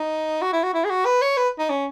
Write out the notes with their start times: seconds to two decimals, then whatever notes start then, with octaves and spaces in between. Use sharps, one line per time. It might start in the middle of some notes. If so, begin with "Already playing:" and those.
Already playing: D#4
0.42 F#4
0.53 E4
0.63 F#4
0.74 E4
0.85 G#4
0.90 F#4
1.06 B4
1.22 C#5
1.37 B4
1.59 D#4
1.70 C#4